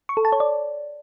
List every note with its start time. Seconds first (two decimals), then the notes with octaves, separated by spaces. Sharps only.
0.09 C#6
0.17 A4
0.25 A5
0.32 C#5
0.40 D5